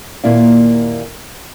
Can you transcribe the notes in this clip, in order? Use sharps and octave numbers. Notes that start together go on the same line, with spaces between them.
D#2 A#2 A#3 E4 D5 F5